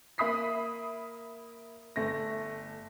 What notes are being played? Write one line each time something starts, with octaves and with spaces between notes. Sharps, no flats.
A#3 E5 B5 D#6 B6 C7
G1 A3 A#6